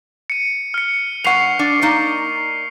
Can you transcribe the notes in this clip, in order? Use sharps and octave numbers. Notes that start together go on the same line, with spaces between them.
C#7 D#7
F6 C#7
G2 F#5 C#6 C7 F7
D4
A#3 D#4 D5